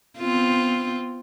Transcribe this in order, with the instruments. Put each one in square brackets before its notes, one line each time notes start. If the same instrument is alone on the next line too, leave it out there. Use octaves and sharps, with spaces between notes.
[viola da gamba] B3 C4 F4